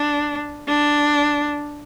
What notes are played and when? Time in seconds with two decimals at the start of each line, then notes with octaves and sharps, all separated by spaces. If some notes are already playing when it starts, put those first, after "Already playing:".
Already playing: D4
0.68 D4